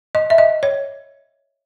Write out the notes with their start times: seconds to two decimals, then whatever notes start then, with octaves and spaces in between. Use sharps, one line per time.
0.15 D#5
0.30 E5
0.38 D#5
0.63 C#5